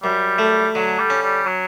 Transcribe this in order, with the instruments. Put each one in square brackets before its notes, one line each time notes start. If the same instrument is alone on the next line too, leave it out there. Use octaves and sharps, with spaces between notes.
[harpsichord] F#2 [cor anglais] G3
[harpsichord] A3
[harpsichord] D3 [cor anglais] F#3
[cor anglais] G3
[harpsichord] C#4
[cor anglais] G3
F#3